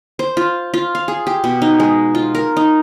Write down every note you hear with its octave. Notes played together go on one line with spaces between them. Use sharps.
C5
F4
F4
F5
G#4
G4
B2
D#4
G#3
F4
A#4
D#4